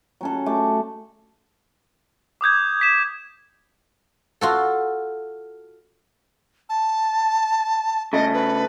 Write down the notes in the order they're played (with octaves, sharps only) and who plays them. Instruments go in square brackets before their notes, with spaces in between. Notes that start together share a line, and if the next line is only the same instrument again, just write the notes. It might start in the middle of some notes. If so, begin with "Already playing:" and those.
[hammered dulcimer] F#3 C#4 A4
A3 D6
[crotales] D6 D#6 G6 G#6
B6 E7
[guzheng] F4 F#4 A4
[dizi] A5
[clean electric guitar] C#3 A3 [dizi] D#5
[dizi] B4